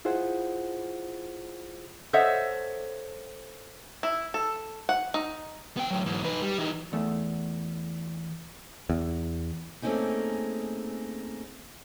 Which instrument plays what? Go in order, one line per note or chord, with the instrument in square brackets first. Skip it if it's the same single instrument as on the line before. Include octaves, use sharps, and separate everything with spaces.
[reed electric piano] E4 F4 G#4 C5 F#5
[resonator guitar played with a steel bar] A4 C5 C#5 D#5 E5 F#5
[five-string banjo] E4
A4
F#5
D#4
[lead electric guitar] B3 G5
A2 F#3
G#2 E3
D#4 B4
G3
E3 D#4
[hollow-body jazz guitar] E2 A3
[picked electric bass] E2
[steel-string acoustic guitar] A3 A#3 C4 C#4 D#4 G#4